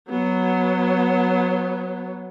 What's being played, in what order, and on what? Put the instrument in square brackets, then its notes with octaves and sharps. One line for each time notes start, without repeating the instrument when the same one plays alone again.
[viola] F#3 B3